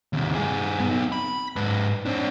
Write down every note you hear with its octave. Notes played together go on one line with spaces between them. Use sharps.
D#2 C3
G2 G#4
B3 D#4
B5
G#2 B4
C4 D4